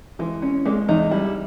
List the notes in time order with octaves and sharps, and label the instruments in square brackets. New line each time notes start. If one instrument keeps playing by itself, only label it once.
[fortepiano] E3 [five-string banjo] G#3
[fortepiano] C#4
[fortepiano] G#3 [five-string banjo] A#3
[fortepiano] E2 [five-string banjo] D#4
[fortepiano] G3 [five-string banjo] E4